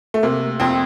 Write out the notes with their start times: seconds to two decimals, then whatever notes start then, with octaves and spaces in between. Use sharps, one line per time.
0.14 A3
0.23 C3 A#3
0.60 F2 C4